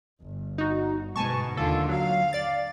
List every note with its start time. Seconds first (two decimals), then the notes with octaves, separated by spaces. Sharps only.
0.21 G1
0.58 D#4 F#4
1.16 G1 G#2 B2 G#5 A5 C#6
1.57 D#2 D3 F4 A4
1.89 F#3 F5
2.33 D5 A6